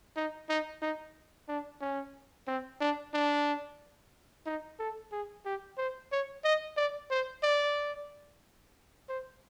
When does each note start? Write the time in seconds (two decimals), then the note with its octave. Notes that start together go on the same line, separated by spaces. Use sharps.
0.17 D#4
0.49 D#4
0.82 D#4
1.48 D4
1.81 C#4
2.47 C4
2.81 D4
3.14 D4
4.46 D#4
4.79 A4
5.12 G#4
5.45 G4
5.78 C5
6.12 C#5
6.44 D#5
6.77 D5
7.11 C5
7.43 D5
9.09 C5